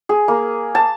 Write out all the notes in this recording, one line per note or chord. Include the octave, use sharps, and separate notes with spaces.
G#4
A#3
A5